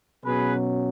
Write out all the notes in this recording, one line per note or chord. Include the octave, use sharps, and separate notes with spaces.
B2 F#3 C#4 G#4 B4